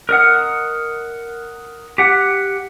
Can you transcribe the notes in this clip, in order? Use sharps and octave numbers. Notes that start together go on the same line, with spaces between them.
A#4 D#5 F#5
G4 F#5